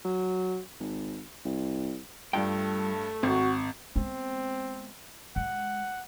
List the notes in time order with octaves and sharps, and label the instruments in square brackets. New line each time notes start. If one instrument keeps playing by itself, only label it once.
[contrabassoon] F#3
G#1
C2
[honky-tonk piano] G2 [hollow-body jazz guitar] G3 F4 G5 [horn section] A3
[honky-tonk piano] G#1 [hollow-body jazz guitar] C4 [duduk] F#4
[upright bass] G#3 B3 [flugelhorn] C4
[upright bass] G#3 [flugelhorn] F#5